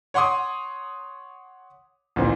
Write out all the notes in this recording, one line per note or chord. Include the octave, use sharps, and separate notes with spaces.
C#5 F#5 C6 D6 D#6
A1 A#2 D#3 C4